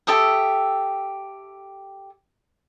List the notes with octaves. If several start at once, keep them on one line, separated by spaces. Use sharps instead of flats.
G4 A4 E5 D#6